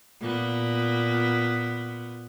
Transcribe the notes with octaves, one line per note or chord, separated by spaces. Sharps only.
A#2 B3